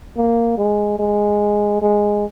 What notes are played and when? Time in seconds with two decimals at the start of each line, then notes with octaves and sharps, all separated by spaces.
0.17 A#3
0.58 G#3
0.99 G#3
1.82 G#3